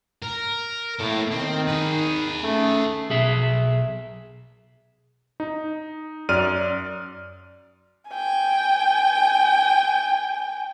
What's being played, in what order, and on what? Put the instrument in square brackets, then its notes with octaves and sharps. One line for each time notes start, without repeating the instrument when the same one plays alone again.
[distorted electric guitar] A#4
[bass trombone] A2 [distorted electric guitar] A#3 A4
[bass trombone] D#3 [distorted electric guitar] C4
[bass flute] D#4 [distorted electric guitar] G#4 B4
[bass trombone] A3 [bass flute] C#4
[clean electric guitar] B1 G#4 E5
[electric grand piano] D#4
F#2 D5 F6 D#7
[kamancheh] G5 G#5